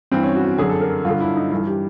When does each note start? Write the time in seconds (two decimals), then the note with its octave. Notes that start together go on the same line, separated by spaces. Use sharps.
0.12 G2 E3 C4
0.23 C#4
0.35 F#4
0.46 F#4
0.58 F#2 D3 G#4
0.69 A4
0.81 A#4
1.05 G2 D3 F4
1.20 E4
1.36 D#4
1.52 G2 E3
1.67 G4